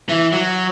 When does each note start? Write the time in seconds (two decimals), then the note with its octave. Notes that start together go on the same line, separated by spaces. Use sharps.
0.09 E3
0.33 F#3